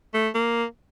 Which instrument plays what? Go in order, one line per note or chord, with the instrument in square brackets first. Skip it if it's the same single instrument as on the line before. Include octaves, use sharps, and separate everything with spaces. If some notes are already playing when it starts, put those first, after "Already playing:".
[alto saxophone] A3
A#3